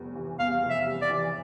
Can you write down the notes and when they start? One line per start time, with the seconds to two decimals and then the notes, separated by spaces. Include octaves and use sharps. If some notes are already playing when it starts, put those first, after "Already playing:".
Already playing: F1 E2 G3
0.16 E3
0.39 E2 F5
0.63 F1
0.70 E5
0.86 G3
1.02 D5
1.10 E3